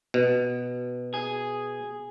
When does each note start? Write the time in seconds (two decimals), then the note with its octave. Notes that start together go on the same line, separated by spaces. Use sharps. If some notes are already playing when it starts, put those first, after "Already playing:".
0.14 B2
1.14 G#4